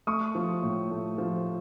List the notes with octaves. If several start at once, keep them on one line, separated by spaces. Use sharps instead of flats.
A3 C#6 D#6
F3
A2
A3
F3